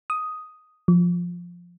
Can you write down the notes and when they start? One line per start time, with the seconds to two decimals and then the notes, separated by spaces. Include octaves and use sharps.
0.10 D#6
0.88 F3